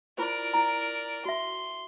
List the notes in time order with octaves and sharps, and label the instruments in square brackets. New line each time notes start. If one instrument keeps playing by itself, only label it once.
[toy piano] E4 F4 C5 [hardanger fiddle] A#4 D5
[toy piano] E4 A#5
[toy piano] F#4 E5 [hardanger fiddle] C6